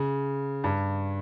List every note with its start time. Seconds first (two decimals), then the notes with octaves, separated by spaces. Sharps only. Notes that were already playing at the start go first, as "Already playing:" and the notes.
Already playing: C#3
0.64 G2